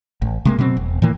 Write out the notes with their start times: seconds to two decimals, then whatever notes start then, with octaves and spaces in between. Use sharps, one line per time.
0.22 A1
0.45 C3 G#3 A#3
0.59 B2 F#3 B3 C4
0.77 E1
1.02 A2 D#3 E3 A#3